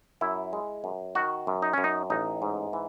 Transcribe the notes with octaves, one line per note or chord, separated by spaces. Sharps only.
F#2 E4
G#3
F#2
D#3 F#4
F#2
D#4
F#2 C#4
D#4
A1 D#4
G#2
E3